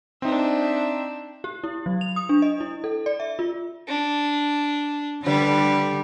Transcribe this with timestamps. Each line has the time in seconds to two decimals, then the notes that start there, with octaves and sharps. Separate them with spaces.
0.22 C4 D4 D#4 E5
1.44 G4
1.64 E4
1.86 F#3
2.01 F7
2.16 D#6
2.29 D4
2.42 D#5
2.60 E4
2.84 A4
3.06 D5
3.20 E5
3.39 F4
3.88 D4
5.24 D3 G3 B4